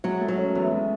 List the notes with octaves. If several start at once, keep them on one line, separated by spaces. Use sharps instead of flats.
F#3 G#3
A3
F#3
C#4
E2 B3
G#3